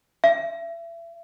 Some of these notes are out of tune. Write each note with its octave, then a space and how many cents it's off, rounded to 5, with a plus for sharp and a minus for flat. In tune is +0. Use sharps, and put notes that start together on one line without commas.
E5 +30